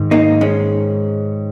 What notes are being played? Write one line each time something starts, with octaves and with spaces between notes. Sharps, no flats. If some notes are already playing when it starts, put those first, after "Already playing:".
Already playing: G#2 D#3
A#3 D#4
G#3 C#4